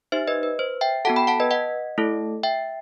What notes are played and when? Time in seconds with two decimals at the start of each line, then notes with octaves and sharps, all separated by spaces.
0.12 D#4 G4 C5 E5
0.28 B4 D#5
0.43 B4
0.59 C5
0.81 E5 G5
1.05 B3 F#4 A4 F#5 A5
1.16 G5 B5
1.27 F#5 A5
1.40 B4 D#5
1.51 D#5 F#5
1.98 A3 E4 A4
2.43 E5 G5